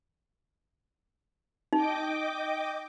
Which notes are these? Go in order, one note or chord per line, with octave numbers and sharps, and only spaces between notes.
D#4 D#5 G5 D6